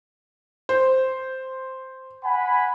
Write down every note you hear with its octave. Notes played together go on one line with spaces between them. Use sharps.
C5
F#5 G#5 B5